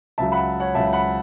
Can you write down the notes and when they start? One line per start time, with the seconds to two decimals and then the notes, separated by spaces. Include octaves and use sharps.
0.18 C#2 C#3 F#3 E5 A5
0.32 F#5 B5
0.60 C#5 F#5
0.75 C#2 C#3 F#3 E5 A5
0.93 F#5 B5